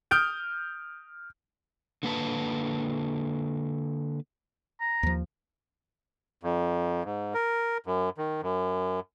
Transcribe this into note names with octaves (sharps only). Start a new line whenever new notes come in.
D#6 F6 G6 D7
D3 A#3 B4 A5
A#5
D#2 F3
F2
G#2
A#4
F#2
D#3
F#2